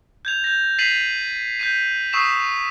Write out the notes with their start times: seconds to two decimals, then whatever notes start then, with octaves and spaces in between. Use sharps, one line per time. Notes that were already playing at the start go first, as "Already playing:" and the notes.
0.25 G6 G#6 F7
0.44 G6 G#6 A#6
0.78 A6 B6 C7 D#7 F7 F#7
1.59 G6 B6 D#7
2.13 C#6 D#6 E6 B6 C7 E7